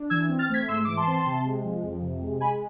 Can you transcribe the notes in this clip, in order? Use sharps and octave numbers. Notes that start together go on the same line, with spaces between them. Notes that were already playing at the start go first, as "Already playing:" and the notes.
Already playing: D4
E3 E6 G#6
C4
F6 A6
A3 G#6 B6
G#2 C6 E6
E3 D6
A5 C6
C4
C3
G#3
F3
F2
C3
G#3
G#3 G#5 B5